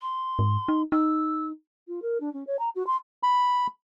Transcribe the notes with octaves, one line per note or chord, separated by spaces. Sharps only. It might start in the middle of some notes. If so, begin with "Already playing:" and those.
C6
G#2
D#4
D#4 E6
F4
A#4
D4
C#4
C#5
A#5
F#4
C6
B5